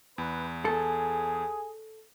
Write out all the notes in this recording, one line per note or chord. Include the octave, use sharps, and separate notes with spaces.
E2 B4
G#4 A4